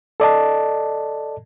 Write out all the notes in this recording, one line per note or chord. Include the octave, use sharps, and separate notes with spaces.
A4 D5 D#5 A5